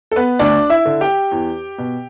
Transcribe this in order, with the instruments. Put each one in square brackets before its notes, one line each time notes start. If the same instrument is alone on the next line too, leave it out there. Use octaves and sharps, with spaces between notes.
[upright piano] A4
B3 B4
D2 D4 D5
E4 E5
D3
G4 G5
E2
B2